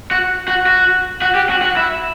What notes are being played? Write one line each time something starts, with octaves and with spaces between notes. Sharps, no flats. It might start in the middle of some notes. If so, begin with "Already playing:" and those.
F#4
F#4
F#4
F#4
G4
F#4
F#4
E4